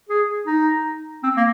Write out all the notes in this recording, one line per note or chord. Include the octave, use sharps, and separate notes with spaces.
G#4
D#4
C4
A#3